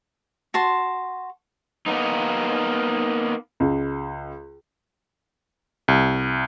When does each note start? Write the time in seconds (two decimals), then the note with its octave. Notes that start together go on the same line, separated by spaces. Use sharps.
0.54 F#4 A5 C6
1.86 A#3 B3 D#4
3.60 C#2
5.88 C2